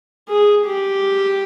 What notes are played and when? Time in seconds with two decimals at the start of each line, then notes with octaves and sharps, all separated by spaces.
0.29 G#4
0.66 G4